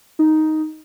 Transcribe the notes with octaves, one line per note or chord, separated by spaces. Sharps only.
D#4